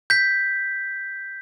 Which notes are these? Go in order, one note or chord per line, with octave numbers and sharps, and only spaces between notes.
G6 B6